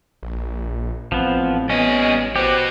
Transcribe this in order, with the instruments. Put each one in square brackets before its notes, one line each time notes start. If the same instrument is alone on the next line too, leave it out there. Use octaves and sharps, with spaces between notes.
[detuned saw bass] A#1
[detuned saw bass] A1 [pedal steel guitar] F3 B3 [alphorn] C4
[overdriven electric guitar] G3 D#5 [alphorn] B3 [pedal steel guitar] C#4
[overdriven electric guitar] B3 F#4 [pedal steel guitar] G4 [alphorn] C5